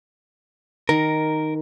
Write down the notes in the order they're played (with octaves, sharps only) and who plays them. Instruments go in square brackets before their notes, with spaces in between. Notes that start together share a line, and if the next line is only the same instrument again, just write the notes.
[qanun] D#3 [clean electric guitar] A#4